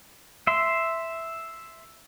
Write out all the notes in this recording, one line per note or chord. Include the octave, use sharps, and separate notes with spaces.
E5 C6